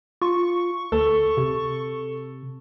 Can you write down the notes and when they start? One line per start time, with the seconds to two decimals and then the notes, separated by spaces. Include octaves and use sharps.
0.22 F4 C#6
0.92 D2 A4
1.37 C3